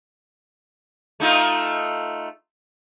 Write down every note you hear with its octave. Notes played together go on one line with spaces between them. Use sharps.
A3 D#4 F4